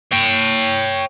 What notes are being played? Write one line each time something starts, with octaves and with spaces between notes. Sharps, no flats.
C#5 G5